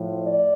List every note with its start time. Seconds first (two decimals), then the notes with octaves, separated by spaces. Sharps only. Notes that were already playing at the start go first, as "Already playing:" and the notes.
Already playing: A2 F3
0.20 D5